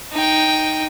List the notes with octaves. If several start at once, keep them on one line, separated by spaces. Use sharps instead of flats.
D#4 G5